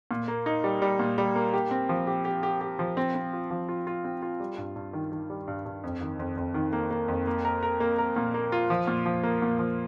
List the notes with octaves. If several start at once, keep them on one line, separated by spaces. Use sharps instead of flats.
A#2
A#3
D#4
G3
G3
A#2
G3
A#3
G4
C4
F3
G4
G4
G4
G4
F3
C4
C4
F4
F3
F4
F4
C4
F4
G3
G2
G2
D#3
D#3
G3
G2
G2
F2
D#3
F2
F2
D#3
A#3
A#3
F2
A#3
A#4
A#4
A#3
A#4
A#2
A#3
F4
F3
A#2
F3
A#3
A#2
F3